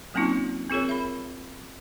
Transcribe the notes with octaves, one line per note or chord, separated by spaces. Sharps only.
F#3 A#3 C4 C#4 D#4 F4
C4 F4 G#4 A#4 C#5
E5 B5